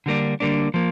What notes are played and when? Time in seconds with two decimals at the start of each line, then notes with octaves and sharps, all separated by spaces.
0.06 D3 G3 A#3 D4
0.40 D3 G3 A#3 D4
0.74 F3 A#3